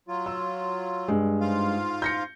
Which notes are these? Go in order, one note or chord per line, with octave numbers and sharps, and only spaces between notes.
F#3 F4
E6
G2 G#3
G#2 F4 F5
G6 A#6 C#7